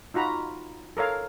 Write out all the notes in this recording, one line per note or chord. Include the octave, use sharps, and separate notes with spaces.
D#4 F4 F#4 A#5 B5
A4 A#4 C#5 F5